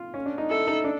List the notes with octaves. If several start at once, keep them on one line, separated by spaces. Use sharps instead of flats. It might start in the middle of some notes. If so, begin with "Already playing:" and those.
Already playing: F4
C#4
D4
D#4
E4 A4
D#4
D4